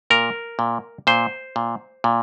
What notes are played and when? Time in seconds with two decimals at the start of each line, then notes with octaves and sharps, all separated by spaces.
0.10 A#2 A#4
0.59 A#2
1.07 A#2 C5
1.56 A#2
2.04 A#2